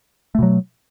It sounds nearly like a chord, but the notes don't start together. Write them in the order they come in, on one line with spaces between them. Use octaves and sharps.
A3 B2 F#3